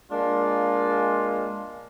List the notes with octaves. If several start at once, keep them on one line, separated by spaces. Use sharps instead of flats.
G#3 A#3 D4 F4